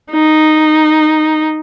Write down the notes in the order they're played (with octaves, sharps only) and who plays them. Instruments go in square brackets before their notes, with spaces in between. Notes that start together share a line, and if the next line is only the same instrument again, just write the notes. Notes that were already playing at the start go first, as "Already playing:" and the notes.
[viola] D#4